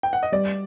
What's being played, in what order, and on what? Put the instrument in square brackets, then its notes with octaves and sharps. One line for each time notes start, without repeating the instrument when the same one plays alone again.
[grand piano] G5
F#5
D#5
[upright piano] G3 [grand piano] D5